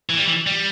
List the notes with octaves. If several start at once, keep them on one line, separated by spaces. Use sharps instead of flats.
E3
G3
E3
G3